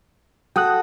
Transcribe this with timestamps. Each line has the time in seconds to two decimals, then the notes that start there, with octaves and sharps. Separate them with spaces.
0.56 F#4 A4 G5 D#6 F#6